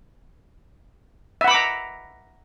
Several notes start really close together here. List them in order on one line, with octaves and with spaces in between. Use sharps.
E5 F#5 B5 D6 A#5